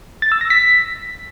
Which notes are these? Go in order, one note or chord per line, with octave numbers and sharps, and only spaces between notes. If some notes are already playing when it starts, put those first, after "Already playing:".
A6
E6
A#6
B6